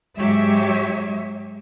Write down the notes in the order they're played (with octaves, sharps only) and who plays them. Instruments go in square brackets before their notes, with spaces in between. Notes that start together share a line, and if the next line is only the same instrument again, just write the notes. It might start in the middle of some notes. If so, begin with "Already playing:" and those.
[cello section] G#2 F#3 G#3 G4 C#5 E5